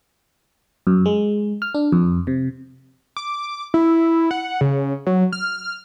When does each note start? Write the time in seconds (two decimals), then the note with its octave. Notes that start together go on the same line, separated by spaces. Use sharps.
0.87 F#2
1.06 G#3
1.62 F6
1.75 D4
1.92 F2
2.27 C3
3.17 D6
3.74 E4
4.31 F#5
4.61 C#3
5.07 F#3
5.32 F6